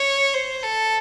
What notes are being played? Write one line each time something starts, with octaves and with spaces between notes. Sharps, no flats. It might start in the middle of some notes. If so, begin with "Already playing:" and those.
Already playing: C#5
C5
A4